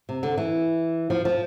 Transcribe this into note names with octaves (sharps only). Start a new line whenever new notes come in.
C3
D3
E3
F3
F3